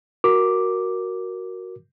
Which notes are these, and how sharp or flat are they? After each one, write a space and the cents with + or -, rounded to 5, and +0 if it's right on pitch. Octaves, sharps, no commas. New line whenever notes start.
F#4 +0 A#4 +0 D6 +0